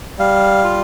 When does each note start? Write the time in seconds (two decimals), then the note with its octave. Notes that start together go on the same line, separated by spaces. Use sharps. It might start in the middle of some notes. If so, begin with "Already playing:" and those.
0.19 G3 F5
0.64 F4